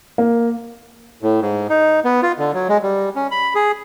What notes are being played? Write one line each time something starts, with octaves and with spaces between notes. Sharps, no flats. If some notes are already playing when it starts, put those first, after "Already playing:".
A#3
A2
G#2
D#4
B3
F4
D3
F#3
G#3
G3
C#4
B5
G#4